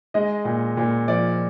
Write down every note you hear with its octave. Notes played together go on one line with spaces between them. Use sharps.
G#3 D#5
A#2
A#2
F3 D5